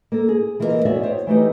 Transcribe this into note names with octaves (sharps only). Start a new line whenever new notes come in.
A#3 A4
G#4
E3 A#3 F4 F#4 A#4 D#5
E3 B3 F#4 C#5 D5 E5
C5 C#5 G5
E3 A3 D#4 G4